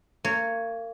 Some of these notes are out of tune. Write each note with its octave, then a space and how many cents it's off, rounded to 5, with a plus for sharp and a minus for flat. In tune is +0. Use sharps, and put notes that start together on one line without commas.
A#3 -30 C#5 +0